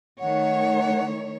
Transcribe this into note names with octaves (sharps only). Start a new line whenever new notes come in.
D#3 A3 C#5 F#5